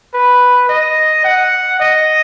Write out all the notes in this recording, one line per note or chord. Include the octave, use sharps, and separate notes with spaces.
B4
D#5
F#5
D#5